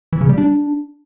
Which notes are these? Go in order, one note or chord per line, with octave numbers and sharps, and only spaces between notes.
E3
C#3
G3
D4